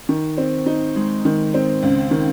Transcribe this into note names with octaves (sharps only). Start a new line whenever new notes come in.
D#3
C4
D#4
G#3
D#3
C4
C#2
D#3